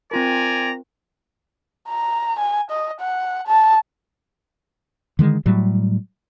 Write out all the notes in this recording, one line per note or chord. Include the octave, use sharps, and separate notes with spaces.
C4 F4 A#4 D5 G#5 A#5
A#5
G#5
D#5
F#5
A5
D3 D#3 G#3
A2 F#3 G3